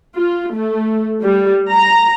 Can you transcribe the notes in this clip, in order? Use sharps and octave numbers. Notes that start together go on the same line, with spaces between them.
F4
A3
G3
A#5